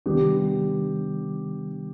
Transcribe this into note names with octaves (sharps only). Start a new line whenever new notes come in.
C3 D#3 G3 B3 D4 G4